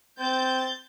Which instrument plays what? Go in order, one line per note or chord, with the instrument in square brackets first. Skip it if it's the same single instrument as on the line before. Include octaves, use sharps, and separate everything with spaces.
[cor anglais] C4 [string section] G6 A6